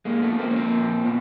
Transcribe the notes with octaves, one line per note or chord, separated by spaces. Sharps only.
A#2 G#3 A#3
A3 B3
F3
A#3 C4
C#4
F3 A#3 C4
A#2
A#2 B3